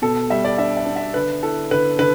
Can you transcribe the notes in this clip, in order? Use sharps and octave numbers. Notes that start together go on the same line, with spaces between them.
B2 A4
G3 E5
D5
D4 E5
E5
D4
E5
D3 B4
E4 A4
D3 B4
D3 B4